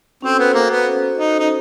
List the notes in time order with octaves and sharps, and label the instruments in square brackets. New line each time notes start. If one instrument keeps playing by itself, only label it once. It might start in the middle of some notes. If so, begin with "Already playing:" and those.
[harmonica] C4 [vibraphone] C#4 F#4 A4 C5
[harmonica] B3
A#3
B3
D#4
D#4